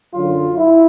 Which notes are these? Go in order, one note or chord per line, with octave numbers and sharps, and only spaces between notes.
F#2 D3 F#3 F4
E4